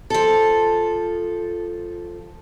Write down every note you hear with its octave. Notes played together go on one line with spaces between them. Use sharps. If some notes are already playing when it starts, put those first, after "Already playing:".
F3 A4